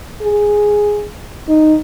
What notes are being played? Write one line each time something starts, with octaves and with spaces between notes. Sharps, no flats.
G#4
D#4